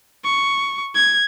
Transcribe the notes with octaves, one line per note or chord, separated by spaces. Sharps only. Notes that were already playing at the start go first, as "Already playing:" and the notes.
C#6
G#6